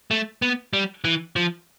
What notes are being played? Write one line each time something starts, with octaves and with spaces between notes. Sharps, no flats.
A3
B3
G3
E3
F3